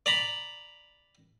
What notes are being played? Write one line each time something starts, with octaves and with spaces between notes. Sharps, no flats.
D5 A#5 B5